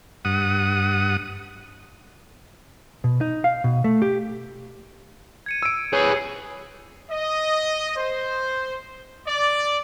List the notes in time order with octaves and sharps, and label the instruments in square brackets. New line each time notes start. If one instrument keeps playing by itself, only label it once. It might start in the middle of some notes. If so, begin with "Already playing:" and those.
[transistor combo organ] G2 F#5 D#6
[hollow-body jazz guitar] B2
D#4
F5
B2
A3
G4
[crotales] G#6 C#7 D#7
[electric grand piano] E6 D7
[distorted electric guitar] G#4 B4 [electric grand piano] C#5 [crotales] G6 C7
[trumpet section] D#5
C5
D5